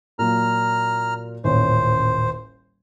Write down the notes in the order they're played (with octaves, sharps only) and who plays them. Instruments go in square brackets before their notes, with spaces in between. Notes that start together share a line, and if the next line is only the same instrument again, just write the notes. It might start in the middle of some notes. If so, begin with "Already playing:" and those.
[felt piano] A#2 F#3 F4 [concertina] A#5 F6
[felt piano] D#1 A1 C#5 [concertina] C5